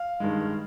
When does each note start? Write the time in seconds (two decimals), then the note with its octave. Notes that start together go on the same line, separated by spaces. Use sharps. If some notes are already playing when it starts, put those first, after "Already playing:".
Already playing: F5
0.20 G2 D#3 G#3